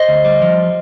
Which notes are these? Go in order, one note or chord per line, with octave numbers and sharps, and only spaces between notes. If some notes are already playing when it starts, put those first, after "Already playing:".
Already playing: C5 D#5
D2
G3
F3